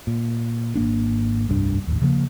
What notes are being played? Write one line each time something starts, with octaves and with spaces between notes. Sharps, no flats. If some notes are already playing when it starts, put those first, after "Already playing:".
A#2
G#1 A#3 D4
F1 C2 G2 D4
A1 D#2
C#3 F3 A#3